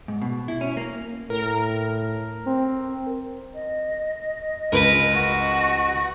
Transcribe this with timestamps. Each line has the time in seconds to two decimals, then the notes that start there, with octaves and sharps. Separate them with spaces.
0.08 G#2
0.22 B2
0.48 E4
0.61 C#4
0.77 A#3
1.30 A2 A#4
2.47 C4
3.54 D#5
4.72 C#2 A#4 B4
5.15 F#4